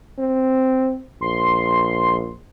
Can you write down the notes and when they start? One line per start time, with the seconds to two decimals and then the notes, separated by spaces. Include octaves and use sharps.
0.18 C4
1.21 A#1 C6